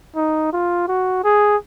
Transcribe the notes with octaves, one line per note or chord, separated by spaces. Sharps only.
D#4
F4
F#4
G#4